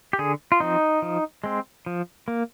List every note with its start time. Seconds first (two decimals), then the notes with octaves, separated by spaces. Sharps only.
0.13 G4
0.19 D3 G#4
0.52 F4
0.60 F3 C4 D#4
1.02 F3
1.44 G#3 C4
1.86 F3
2.28 A#3